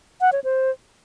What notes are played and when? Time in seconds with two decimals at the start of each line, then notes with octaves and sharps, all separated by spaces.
0.21 F#5
0.33 C#5
0.44 C5